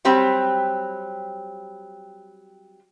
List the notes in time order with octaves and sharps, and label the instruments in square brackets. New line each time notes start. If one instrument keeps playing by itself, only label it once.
[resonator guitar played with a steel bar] F#3 G3 C4 G4